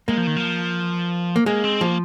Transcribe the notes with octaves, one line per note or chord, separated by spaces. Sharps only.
G#3 A#3
F3
D#3
F3
A#3
G#3 A#3
C4
F3 A#3